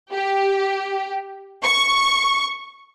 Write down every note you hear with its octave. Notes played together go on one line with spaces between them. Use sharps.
G4
C#6